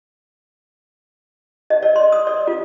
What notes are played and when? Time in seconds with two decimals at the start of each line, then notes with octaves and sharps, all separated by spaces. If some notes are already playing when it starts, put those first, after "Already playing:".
1.70 D#5
1.83 D5
1.96 C6
2.12 D#6
2.27 D5
2.48 F4